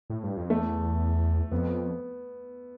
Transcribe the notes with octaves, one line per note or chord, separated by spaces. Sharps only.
A2
G2
F2
E2 A3
F2 B3